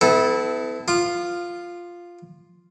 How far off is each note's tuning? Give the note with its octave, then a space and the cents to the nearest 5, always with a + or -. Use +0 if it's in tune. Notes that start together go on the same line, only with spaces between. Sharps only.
B3 +35 E4 -20 A4 -10
F4 +0 D#6 -45